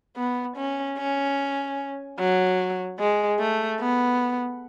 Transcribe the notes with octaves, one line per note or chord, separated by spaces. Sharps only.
B3
C#4
C#4
F#3
G#3
A3
B3